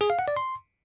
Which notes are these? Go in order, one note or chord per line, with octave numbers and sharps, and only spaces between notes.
G#4
F5
F#5
D5
C6